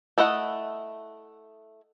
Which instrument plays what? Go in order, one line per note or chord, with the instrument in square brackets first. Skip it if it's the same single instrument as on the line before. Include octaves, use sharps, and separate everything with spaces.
[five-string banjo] A3 E4 D#5 F#5